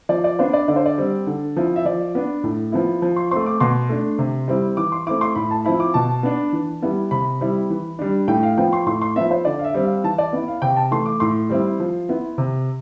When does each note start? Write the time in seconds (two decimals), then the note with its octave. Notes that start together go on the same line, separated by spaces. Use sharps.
0.09 F3 D5
0.24 D5
0.39 B3 D4 C5
0.53 D5
0.68 D3 D5
0.76 C5
0.86 D5
0.98 G3 C4
1.27 D3
1.56 F3 C4 E4
1.76 E5
1.85 F3 D5
2.15 B3 D4
2.44 A2
2.72 F3 B3 E4
3.02 F3
3.16 C6
3.31 A3 C4 C6
3.46 D6
3.60 B2 C6
3.89 A3 D4
4.19 C3
4.48 G3 C4 E4
4.77 E3 D6
4.92 C6
5.07 A3 C4 E4 D6
5.21 C6
5.35 A2 B5
5.51 A5
5.65 F3 C4 E4 B5
5.80 D6
5.94 B2 A5
6.23 B3 D4
6.53 E3
6.82 G3 B3 E4
7.11 C3 B5
7.40 G3 C4 E4
7.70 E3
7.99 G3 D4
8.28 A2 G5
8.43 F5
8.58 F3 B3 G5
8.73 C6
8.86 A2 C6
9.02 C6
9.16 F3 B3 E5
9.31 C5
9.45 D3 D5
9.59 F5
9.64 E5
9.74 G3 C4
9.85 F5
10.04 E3 A5
10.18 D5
10.33 B3 E4
10.48 F5
10.62 C3 G5
10.77 A5
10.91 E3 A3 C6
11.06 D6
11.20 A2 C6
11.49 G3 C4 E4
11.80 F3
12.09 B3 E4
12.38 C3